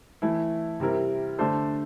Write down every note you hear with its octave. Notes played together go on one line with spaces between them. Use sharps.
E3 A3 E4
C3 G3 C4 E4 A#4
D3 A3 D4 A4 C5